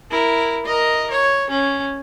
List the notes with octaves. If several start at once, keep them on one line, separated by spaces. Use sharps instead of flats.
E4 A#4
A#4 D#5
C#5
C#4